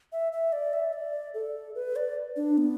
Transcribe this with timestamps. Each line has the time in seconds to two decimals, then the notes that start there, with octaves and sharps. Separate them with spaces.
0.12 E5
0.33 E5
0.53 D5
0.73 E5
0.93 D5
1.34 A4
1.75 B4
1.96 D5
2.36 D4
2.58 B3